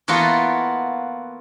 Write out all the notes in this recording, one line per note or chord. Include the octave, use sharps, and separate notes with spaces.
E3 A#3 B3 F4 F#4 A4